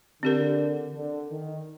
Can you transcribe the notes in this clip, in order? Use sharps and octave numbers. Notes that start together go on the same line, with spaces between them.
D3 C4 G4 A#4
D3
D#3